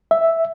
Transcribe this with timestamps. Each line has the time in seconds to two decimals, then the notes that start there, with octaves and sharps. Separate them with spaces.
0.11 E5